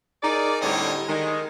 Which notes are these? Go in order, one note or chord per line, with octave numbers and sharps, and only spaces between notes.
D#4 G#4 A#4 D5
A2 D3 G3 C4 C#5 D#5
D#3 G#3